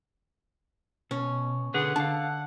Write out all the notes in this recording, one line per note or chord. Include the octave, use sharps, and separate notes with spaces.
B2 C#4
D3 G#4 B4 F#5
D3 F5 A5